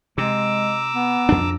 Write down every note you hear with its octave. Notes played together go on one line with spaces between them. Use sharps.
C3 G#3 A#5 D6 E6
B3
F2 D4